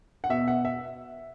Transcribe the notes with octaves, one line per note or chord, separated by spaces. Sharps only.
F#5
B2 E5
F#5
E5